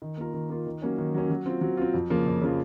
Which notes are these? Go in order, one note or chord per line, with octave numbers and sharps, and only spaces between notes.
D#3
A#3 F4 A#4
D#3
A#3 F4 A#4
D#3
F#3 A#3 C#4
D#3
F#3 A#3 C#4
F#3
C4 F4
F#3
C4 F4
F2
C#3 F3 A#3 F4
F2
C#3 F3 A#3 F4